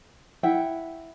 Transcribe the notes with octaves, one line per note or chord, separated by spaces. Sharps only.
E4 E5 F#5 G5